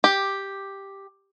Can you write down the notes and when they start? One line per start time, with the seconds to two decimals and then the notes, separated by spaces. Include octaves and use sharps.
0.04 G4